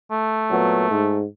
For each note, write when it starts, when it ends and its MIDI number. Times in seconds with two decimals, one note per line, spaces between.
0.11 1.22 57
0.50 0.88 46
0.50 0.88 54
0.50 0.88 59
0.90 1.25 44